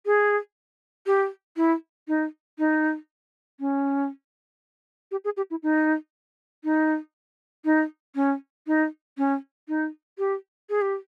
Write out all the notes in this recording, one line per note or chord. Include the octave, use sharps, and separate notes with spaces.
G#4
G4
E4
D#4
D#4
C#4
G4
G#4
G4
E4
D#4
D#4
D#4
C#4
D#4
C#4
D#4
G4
G#4
G4